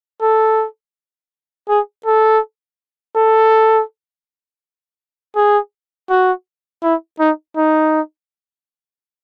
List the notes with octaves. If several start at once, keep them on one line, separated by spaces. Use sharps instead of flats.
A4
G#4
A4
A4
G#4
F#4
E4
D#4
D#4